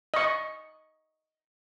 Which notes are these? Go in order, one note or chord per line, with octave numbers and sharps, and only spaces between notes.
D#5 C#6